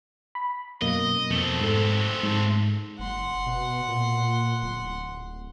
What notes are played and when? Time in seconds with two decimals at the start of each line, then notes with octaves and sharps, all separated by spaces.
0.35 B5
0.82 F#2 B2 A#3 D#5
1.31 F2 B2 A3 C4
1.60 G#2 A4
2.23 G#2
2.99 F#1 F#5 C6
3.46 B2
3.88 A#2
4.62 D1